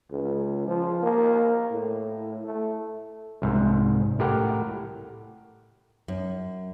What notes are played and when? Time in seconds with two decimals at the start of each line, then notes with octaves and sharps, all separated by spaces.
0.11 C#2
0.67 F3
1.03 A#3
1.71 A2
2.44 A3
3.42 C2 G#2
4.19 A2 G4 A#4 F#5
6.08 F#2